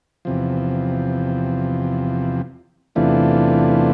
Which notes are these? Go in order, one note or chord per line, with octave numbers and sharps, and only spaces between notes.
E2 C3 F3
E2 C3 E3 A3 D4 F4